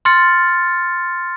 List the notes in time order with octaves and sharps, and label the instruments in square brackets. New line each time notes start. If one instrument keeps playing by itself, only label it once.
[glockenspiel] C6 F6 A6 C#7